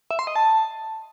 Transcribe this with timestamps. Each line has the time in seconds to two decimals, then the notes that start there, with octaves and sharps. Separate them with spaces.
0.11 E5
0.19 C6
0.27 D#5
0.36 A5